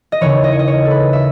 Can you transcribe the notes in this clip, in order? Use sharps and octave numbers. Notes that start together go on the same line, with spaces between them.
D#5
D#2 C#3 E3 C#5
D#5
C#5
D#5
C#5
A4
B4
E5